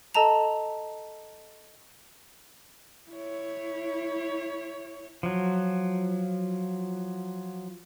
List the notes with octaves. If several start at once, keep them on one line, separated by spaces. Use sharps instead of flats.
A4 D#5 A5 A#5 F7
E4 C#5
F3 F#3